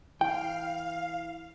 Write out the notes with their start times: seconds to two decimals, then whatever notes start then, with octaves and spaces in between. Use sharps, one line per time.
0.21 E3 F5 G5